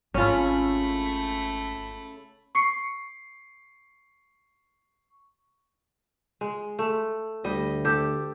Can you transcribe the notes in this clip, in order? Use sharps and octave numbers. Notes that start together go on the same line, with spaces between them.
G#1 C#3 A3 C#4 E4 F4 G#5 B5
C#6 C7 C#7
G#3
A3
D2 G3 D#5
G4 A4